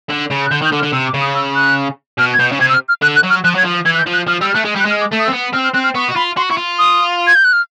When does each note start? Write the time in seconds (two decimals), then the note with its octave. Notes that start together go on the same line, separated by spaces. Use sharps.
0.10 D3
0.30 C#3
0.46 F#6
0.51 D3 G6
0.62 D#3
0.65 G6
0.72 D3
0.79 F6
0.83 D3
0.93 C3 E6
1.07 D6
1.14 C#3
1.21 D#6
1.35 E6
1.56 F#6
2.19 B2 F6
2.34 G#6
2.39 B2 G6
2.52 C#3
2.60 C3 G#6
2.69 E6
2.74 F6
2.89 F6
3.02 D3 F#6
3.16 F#6
3.23 F#3
3.30 F6
3.44 F3 F#6
3.55 F#3 G#6
3.65 F3
3.85 E3 G#6
3.95 F#6
3.99 G6
4.07 F3
4.13 F#6
4.27 F3 F6
4.41 G3 E6
4.50 F6
4.55 A3 F#6
4.65 G#3
4.75 G3
4.80 F#6
4.85 G#3
4.90 F6
5.01 D6
5.12 A3
5.19 D#6
5.25 C4 E6
5.33 B3
5.53 C4 F6
5.64 F6
5.74 C4 F#6
5.84 F6
5.95 B3 C#6
6.08 F#4
6.16 F4 B5
6.37 F#4 C6
6.50 E4 C#6
6.57 F4
6.79 D#6
7.27 G#6
7.35 G6
7.45 F#6
7.53 F6